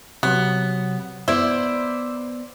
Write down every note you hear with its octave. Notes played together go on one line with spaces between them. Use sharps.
C3 F#3 B3
B3 E4 C5 D5